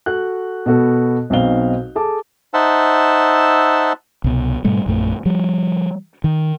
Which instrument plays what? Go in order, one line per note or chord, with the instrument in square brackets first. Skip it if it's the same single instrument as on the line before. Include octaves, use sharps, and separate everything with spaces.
[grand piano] F#4 A4 F#6
B2 B3 F#4 A4
B1 B2 C4 D#4 F5 G7
G#4 A4 A5 D6
[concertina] D#4 C5 E5 F#5 A5 E6
[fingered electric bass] C2 B2
G#2 B2 G3 A3
A#1 F#2 A3
F3 G3
D#3